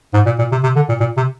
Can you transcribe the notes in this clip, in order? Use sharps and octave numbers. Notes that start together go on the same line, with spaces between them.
G#2
A#2
A#2
C3
C3
D3
A#2
A#2
C3